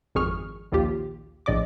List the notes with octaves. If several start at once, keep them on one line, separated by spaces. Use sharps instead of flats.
G#1 F2 G#4 C#6 F6
A#1 D#2 F4 G4
A#1 A2 D5 D#5 D6